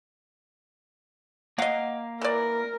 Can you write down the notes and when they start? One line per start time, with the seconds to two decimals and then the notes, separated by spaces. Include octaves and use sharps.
1.58 A#3 D#5 F5 F#5
2.21 E3 A#4 D5